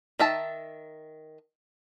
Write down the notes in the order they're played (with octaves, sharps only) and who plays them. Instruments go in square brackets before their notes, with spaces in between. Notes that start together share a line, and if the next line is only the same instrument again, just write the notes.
[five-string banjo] D#3 E5 A5